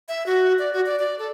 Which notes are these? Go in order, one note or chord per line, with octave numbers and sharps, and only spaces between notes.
E5
F#4
D5
F#4
D5
D5
A4